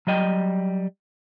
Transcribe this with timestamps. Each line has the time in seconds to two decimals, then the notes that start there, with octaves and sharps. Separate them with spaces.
0.07 F#3 G3 D#5 G5